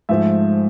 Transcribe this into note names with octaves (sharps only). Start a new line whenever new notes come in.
G#2 F3 A3 E5